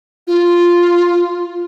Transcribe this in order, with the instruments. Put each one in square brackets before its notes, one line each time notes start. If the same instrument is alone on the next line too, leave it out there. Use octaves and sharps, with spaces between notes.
[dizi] F4